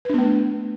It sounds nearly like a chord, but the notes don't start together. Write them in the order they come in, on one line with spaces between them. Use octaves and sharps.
B4 D4 B3 A3